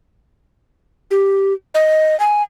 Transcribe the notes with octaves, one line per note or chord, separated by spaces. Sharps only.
G4
D#5
G#5